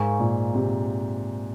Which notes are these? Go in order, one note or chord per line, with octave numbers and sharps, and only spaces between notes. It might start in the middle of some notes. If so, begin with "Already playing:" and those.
Already playing: G#2 A#4 F5 G#5 C#6
A#2
C3